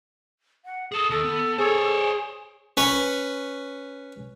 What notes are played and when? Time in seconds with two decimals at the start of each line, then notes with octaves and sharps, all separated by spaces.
0.65 F#5
0.92 G#4 A4 D#6
1.10 D#2 A4
1.24 B3
1.58 G#4 C5 C#5
2.77 C#4 B4 C#5